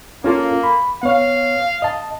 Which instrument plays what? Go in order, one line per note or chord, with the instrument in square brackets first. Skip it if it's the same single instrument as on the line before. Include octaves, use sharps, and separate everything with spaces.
[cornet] A#3 [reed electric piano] C#4 F4 A4
[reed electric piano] B5
[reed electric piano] B3 C#5 [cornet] F5
[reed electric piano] D#5 A5